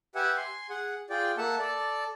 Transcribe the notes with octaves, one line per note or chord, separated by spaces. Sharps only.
G4 B4 E5 F#5 G#5
G#5 C6
G#4 F#5
F4 G#4 D5 G5
A#3 A4 E5 F#5 A5
A4 D5